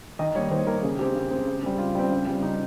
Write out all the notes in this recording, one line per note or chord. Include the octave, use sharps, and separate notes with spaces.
D#3 D#5
G3 A#3 C#5
D#3 C5
G3 A#3 A#4
C#3 G#4
G#3 C4 G4
C#3
G#3 C4
C#3
G3 C4
C#3 F4
G3 C4
C#3
G3 C4
C#3 D#4